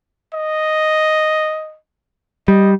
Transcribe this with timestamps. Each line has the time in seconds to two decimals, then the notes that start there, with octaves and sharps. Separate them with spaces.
0.34 D#5
2.48 G3 D#5